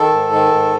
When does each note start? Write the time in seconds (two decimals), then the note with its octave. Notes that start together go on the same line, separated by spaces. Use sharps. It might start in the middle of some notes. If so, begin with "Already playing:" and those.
Already playing: D#3 A4
0.12 G#2
0.32 D#3
0.52 G#2